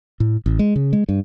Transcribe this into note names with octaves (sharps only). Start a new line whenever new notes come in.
A2
A1
G#3
C#3
G#3
G2